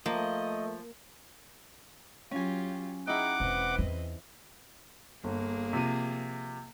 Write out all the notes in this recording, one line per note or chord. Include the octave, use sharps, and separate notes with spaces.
F3 A3 A#3 D#5
F#3 C#4 F4 G4 G#5
D#4 E4 G#4 F#5 G5 A#5 D6
E1 C4 B4 D#5
E2 D#3
G1 A#3 G#4
C3 F3 D#7